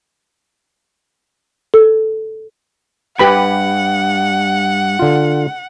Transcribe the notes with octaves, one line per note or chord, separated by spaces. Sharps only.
A4
G2 G4 B4 F#5 B5
D3 F4